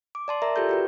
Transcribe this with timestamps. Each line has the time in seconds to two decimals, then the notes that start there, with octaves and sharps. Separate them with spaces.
0.15 D6
0.28 D5 A5 C6
0.42 A#4 D5 E5 A#5
0.56 F4 G4 A4 G6
0.69 F#4 G4 B4